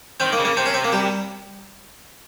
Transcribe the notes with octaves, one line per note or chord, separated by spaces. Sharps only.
D#3 C4
A#3
C#3
A#3
C3 C4
C#4
C4
A#3
G3